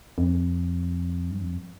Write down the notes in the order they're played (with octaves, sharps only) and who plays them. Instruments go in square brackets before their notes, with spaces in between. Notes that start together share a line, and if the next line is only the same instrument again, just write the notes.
[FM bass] F2
G2
F2